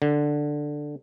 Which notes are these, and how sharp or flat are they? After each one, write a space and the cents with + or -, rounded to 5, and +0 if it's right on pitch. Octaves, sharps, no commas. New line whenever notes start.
D3 +5